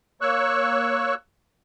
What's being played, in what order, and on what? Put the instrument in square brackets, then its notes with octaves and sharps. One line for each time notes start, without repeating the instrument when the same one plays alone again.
[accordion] A#3 C#5 C#6 E6 F#6